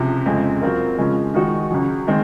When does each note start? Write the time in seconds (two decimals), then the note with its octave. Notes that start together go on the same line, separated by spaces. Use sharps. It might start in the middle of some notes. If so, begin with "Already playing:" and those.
Already playing: C#2 C3 F3
0.26 F2 C#3 G#3 C4 F4
0.61 F#3 C4 F4 A#4
0.98 C#3 F3 G#3 C#4
1.34 D#3 G#3 D#4 F#4
1.71 C#2 C#3 F#3
2.07 D#3 G#3 C4